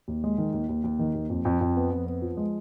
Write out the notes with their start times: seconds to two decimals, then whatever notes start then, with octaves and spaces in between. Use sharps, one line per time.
0.08 D#2
0.24 G#3
0.38 D#3
0.53 D#2
0.69 D#2
0.84 D#2
0.99 D#3
1.15 D#2
1.30 F2
1.45 F2
1.61 F2
1.76 B3
1.92 F2
2.07 B3
2.22 F3
2.37 G#3